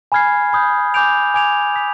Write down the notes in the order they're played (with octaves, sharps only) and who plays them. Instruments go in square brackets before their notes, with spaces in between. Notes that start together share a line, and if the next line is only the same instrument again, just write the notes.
[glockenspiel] G#5 B5 F6 G#6 C7
B5 D#6 G6
G#5 D6 G6 D7 F7
G#5 D6 G#6 D7 F7
D#6 B6 F7